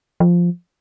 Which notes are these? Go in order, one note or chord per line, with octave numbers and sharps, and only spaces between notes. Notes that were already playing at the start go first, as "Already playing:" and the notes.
F3